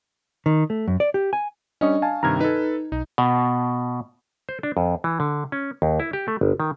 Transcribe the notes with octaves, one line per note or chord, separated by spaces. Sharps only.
D#3
A3
F#2
D5
G4
G#5
G3 C#4 D4 D#5 C#6
F5 G#5 A5
G2 C3 D#3 A#5 F6 G#6
D#4 A4 B4
B1 D#4
B2
C5
D4
F2
E3
D3
C#4
D#2
E4
G4
A3
G1
D#3